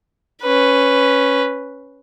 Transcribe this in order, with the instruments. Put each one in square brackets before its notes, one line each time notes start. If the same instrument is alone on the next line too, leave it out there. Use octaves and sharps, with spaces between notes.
[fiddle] C#4 B4